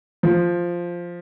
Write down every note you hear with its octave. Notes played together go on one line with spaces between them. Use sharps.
F3